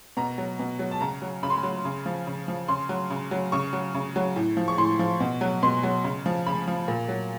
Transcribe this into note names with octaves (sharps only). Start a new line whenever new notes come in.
B2 A#5
F#3
B2
F#3
A5
C#3 A#5
F#3
C#3 B5
C6
B5
F#3
C#3
F3
C#3
F3
C#3 C6
F#3
C#3
F#3
C#3 C#6
F#3
C#3
F#3
A2
F3
C#6
A2 C6
F3
B2
F#3
B2 C6
F#3
C#3
F3
C#3 B5
F3
A#2
F#3